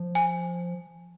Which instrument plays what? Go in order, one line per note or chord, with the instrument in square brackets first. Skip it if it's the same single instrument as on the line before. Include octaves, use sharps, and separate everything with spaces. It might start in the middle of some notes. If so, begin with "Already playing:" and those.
Already playing: [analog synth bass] F3
[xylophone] G#5